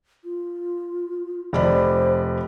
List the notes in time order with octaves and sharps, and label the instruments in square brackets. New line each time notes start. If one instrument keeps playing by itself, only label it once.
[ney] F4
[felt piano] F1 D5 B5 [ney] C5